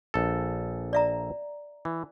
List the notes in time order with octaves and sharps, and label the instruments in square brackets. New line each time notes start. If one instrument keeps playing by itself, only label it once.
[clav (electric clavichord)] A#1 A4
[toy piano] D5 E5 A#5
[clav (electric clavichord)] E3